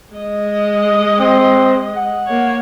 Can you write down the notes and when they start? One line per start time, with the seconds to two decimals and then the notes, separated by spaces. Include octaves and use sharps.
0.14 G#3 D#5
1.20 C4
1.96 F#5
2.26 A#3 C#5